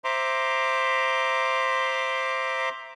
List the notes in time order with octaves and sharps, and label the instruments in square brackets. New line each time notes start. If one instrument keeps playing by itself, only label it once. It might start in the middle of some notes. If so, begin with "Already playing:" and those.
[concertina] C5 E5 A#5 C6 D6